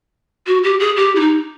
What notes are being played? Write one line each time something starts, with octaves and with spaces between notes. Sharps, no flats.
F#4
G4
G#4
G4
E4
D#4